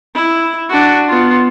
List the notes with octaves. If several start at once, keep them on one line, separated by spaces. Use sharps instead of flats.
E4
D4 F#4
B3 F4